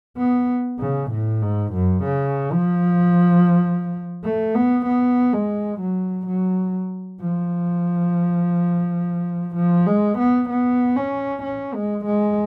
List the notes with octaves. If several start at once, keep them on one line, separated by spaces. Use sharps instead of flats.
B3
C#3
A2
G#2
F#2
C#3
F3
A3
B3
B3
G#3
F#3
F#3
F3
F3
G#3
B3
B3
C#4
C#4
G#3
G#3